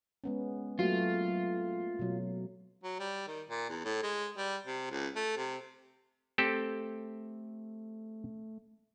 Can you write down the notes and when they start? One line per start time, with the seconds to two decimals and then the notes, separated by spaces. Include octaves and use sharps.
0.24 G#3 B3 C#4
0.79 F#3 A3 A#3 F4
1.99 B2 F#3
2.84 F#3
3.00 G3
3.28 D#3
3.50 A#2
3.69 E2
3.85 A2
4.03 G#3
4.37 G3
4.67 C3
4.91 C#2
5.16 A3
5.37 C3
6.38 A3 C4 G4 A4